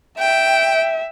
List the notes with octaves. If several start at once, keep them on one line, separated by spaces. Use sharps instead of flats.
E5 G5